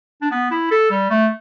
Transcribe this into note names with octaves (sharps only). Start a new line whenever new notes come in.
D4
B3
E4
A4
G3
A3